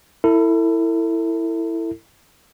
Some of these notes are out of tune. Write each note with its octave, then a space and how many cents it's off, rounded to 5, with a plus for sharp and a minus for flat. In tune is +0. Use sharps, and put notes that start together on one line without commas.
E4 +0 A4 +35